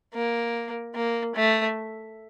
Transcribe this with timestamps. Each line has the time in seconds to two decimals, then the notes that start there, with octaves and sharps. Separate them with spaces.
0.14 A#3
0.95 A#3
1.35 A3